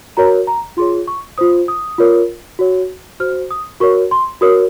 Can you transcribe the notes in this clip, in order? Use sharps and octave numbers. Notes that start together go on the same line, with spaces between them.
F#4 A#4 C#5 A#5
A#5
F4 G#4 C#5 C6
C#6
F4 C5 D#6
D#6
F4 A#4 C#5
F#4 C#5
F#4 C5 F6
D#6
F#4 A#4 C#5 C#6
C6
F#4 A#4 C#5 D#6